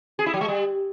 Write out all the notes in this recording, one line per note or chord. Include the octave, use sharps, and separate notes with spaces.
G#4
E4
F#3
G#3
G3